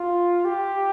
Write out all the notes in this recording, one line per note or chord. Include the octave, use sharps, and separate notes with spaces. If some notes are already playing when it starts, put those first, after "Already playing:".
Already playing: F4
G4